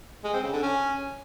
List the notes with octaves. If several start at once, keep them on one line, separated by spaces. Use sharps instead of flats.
G#3
C4
C#3
D3
C#4